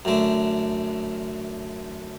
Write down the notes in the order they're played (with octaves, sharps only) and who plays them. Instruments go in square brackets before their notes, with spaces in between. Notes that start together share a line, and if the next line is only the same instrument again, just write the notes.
[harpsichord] F#2 D3 A3